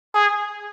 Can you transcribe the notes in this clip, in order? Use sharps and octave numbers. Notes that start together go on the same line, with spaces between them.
G#4